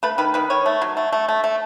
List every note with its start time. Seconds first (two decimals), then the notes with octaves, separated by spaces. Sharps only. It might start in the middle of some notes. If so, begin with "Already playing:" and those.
0.03 A3 B4
0.18 D#3 B4
0.34 D#3 B4
0.50 D#3 C#5
0.66 A3
0.82 F#3
0.97 A3
1.12 A3
1.29 A3
1.44 A3